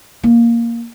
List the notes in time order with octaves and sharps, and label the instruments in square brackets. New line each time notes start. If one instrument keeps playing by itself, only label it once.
[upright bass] A#3